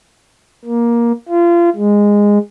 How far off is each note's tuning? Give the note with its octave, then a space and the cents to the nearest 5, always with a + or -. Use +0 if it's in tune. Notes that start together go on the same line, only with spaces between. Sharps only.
A#3 +15
F4 -30
G#3 -15